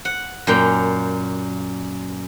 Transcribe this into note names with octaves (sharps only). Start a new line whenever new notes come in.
F#5
F#2 A#2 G5